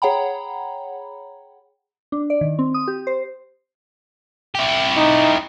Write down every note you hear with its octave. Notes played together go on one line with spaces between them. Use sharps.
G#4 C#5 F#5 G5 A#5 B5
D4
D5
D#3
C4
D#6
G4
C5
E4 G4
D#4